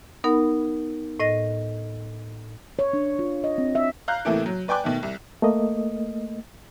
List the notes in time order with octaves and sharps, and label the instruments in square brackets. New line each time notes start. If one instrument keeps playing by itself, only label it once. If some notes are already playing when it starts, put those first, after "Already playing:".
[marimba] B3 D#4 A#4 F#5 B5
A2 D#5 A#6
[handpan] C#5
D4
F4
D#5
C4
E5
[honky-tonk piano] F5 A#5 F#6 G6
A2 C3 E3 A3 A#3
F#3
B4 D5 G5 G#5 D6 F#6
B2 D#3 A3
C2
[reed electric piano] A3 A#3 D#5